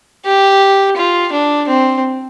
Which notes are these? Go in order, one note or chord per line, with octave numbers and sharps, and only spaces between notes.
G4
F4
D4
C4